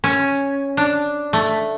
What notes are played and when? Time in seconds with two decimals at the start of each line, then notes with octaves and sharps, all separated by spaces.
0.04 C#4
0.77 D4
1.33 A3